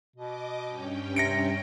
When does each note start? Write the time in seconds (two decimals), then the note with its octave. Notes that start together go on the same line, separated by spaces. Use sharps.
0.16 B2 D#5 D6
0.63 G2 C#4 G5
1.16 C3 A#6 C#7 D7